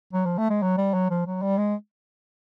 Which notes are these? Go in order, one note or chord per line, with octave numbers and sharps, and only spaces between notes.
F#3
F3
A3
G#3
F#3
G3
F#3
F3
F#3
G3
G#3